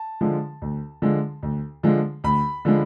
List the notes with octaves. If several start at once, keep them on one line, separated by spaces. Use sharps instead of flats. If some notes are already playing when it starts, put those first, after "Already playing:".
Already playing: A5
D3 F3 G#3
D2
D3 F3 G#3
D2
D3 F3 G#3
D2 B5
D3 F3 G#3